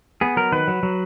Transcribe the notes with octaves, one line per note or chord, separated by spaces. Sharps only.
B3 G#4
F#3 A#4
D#3 B4
F#3
F#3